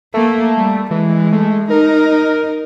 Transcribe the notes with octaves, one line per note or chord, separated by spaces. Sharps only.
A3 A#3
G3
E3 G#3
A3
D#4 A#4